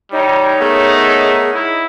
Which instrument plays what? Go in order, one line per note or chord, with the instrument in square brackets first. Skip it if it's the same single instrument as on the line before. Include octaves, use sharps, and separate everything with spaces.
[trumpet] G3 [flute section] D#4 C#5
[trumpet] A3 [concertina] B3 A#4 F#5 [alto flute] G#4
[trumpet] E4